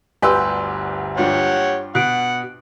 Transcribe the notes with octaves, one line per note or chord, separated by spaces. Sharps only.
G1 D2 G3 G4 B4 G#5 C6 E6
G2 F3 G4 C#5 F#5
B2 F#5 F#6 D7